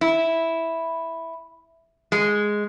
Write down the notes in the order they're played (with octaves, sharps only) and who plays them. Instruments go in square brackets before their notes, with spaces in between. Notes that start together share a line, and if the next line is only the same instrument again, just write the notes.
[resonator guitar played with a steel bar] E4
G#3